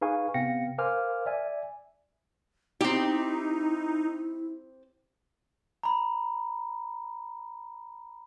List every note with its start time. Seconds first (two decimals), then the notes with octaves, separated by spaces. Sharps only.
0.01 D#4 G#4 B4 F5 G#5 C#6
0.34 C3 B3 F5 G5 A#6 C#7
0.78 A#4 C5 F5 G#5 D6 F6
1.26 D5 E5 G#5
2.81 C4 D#4 E4 G4
5.83 A#5 B5